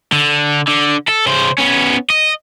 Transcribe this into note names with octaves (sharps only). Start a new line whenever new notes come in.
D3
D3
A4
C#3 C5
B3 C#4
D#5